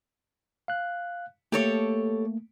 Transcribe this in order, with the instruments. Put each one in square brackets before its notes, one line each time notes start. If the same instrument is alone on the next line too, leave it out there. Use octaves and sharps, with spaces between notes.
[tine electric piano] F5 F#6
[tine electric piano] A3 A#3 [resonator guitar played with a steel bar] G4 A4 C#5